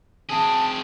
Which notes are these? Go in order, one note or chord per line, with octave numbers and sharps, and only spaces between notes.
C4 G#4 A5